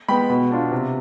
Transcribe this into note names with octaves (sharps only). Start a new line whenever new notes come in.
G#3 B3 G5 B5
B2
B3 D4 F4
C3